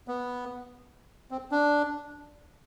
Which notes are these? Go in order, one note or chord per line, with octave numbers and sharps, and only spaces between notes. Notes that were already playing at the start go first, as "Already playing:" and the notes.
B3
C4
D4